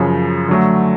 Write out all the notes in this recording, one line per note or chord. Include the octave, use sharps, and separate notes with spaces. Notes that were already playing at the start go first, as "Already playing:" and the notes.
Already playing: F#2 C#3 F3
D3 F#3 A3